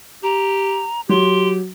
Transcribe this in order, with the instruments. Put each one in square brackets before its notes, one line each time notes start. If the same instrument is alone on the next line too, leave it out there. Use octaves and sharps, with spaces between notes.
[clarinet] G4 [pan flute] A#5
[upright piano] F#3 [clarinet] G4 [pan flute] C6